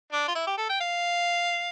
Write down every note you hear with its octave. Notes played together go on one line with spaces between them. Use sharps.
D4
F4
E4
G4
A4
G5
F5